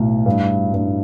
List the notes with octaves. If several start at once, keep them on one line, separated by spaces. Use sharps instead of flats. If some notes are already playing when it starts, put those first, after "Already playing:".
Already playing: B1 A2
G2
G2